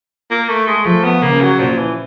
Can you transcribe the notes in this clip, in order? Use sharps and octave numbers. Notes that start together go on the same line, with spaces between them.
A#3
A3
G#3
F3 A3
B3
C#3 A#3
F#3
A#2 F3
E3